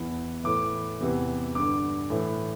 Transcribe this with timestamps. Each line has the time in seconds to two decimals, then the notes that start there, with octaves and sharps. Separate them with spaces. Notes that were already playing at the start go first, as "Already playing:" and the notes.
Already playing: E2 E3
0.44 A2 E3 D6
1.00 E2 C3 E3
1.55 G2 D3 D6
2.10 A2 E3